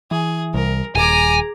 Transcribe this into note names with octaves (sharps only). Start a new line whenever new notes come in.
E3 G#4
C2 A#4
D#1 G#4 G#5 A#5 D6